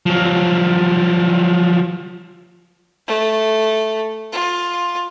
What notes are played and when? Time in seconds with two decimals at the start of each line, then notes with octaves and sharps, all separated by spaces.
0.06 F3 F#3
3.07 A3
4.32 F4